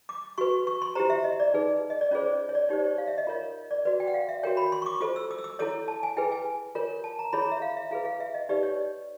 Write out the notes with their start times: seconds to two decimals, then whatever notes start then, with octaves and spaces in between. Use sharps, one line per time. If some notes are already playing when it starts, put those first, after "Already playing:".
0.09 D6
0.38 F#4 B4 C#6
0.67 C#6
0.82 C6
0.95 E4 G4 C5 A#5
1.10 E5
1.24 D#5
1.40 D5
1.54 D#4 G#4 B4
1.90 D#5
2.01 D5
2.11 C#4 F4 G#4 C5 C#5
2.26 D5
2.49 C#5
2.55 D5
2.69 D#4 G4 C5 C#5
2.79 D5
2.84 C#5
2.98 F5
3.08 E5
3.18 D#5
3.27 F4 A#4 C#5
3.71 D5
3.85 F#4 B4 D5
4.00 G5
4.07 F#5
4.14 F5
4.29 E5
4.43 F#4 A#4 C#5 G5
4.57 B5
4.72 C6
4.82 C#6
4.86 D6
5.01 F4 A4 C5 D#6
5.16 E6
5.31 D#6
5.38 E6
5.44 D#6
5.59 E4 A4 C#5 D#6
5.88 A5
6.03 G#5
6.17 E4 G#4 B4 G5
6.32 G#5
6.75 F4 A#4 C#5
7.04 A5
7.19 A#5
7.33 E4 G#4 C#5 B5
7.42 A#5
7.52 E5
7.62 F5
7.77 E5
7.91 E4 G#4 B4 F5
8.05 F5
8.20 E5
8.34 D#5
8.49 D#4 G4 B4 D5
8.63 C#5